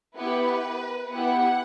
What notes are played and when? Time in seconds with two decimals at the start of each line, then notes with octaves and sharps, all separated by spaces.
0.17 B3 E4 G4 B4
1.10 B3 E4 G4 F#5